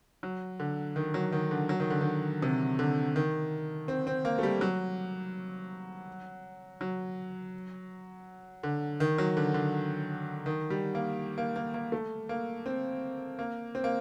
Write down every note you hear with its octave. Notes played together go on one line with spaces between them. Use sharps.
F#3
D3
D#3
F#3
D#3
D3
F#3
D#3
D3
D#3
C3
D3
D#3
C4
C4
A#3
A3
G3
F#3
F#3
D3
D#3
F#3
D3
D3
D#3
G3
A#3
A#3
A#3
A#3
A3
A#3
C4
A#3
C4
A#3